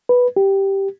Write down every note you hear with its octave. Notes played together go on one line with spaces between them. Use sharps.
B4
G4